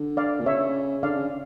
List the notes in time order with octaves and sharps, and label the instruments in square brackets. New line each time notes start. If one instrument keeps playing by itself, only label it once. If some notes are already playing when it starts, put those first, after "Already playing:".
Already playing: [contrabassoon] D3
[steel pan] D5 F5
[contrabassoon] A#2
[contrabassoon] C#3 [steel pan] C#5 E5
[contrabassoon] D3 [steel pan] D5 F5
[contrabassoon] C#3